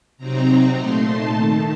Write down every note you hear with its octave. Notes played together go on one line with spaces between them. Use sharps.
C3 F#3 C4 D#4 A#5
A#2 A3 D#4 C6
A5
D#3 A3 D#4